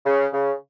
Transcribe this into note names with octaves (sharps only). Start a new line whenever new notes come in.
C#3
C#3